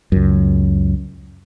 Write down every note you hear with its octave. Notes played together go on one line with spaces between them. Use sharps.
C#2 F#2